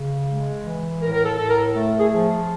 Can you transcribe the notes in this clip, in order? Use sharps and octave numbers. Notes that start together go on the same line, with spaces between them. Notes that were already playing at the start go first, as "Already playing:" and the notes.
Already playing: C#3
G#3
E3
A2 A#4
A#4
A4
A2 A4
A#4
A3 A4
G#4
F3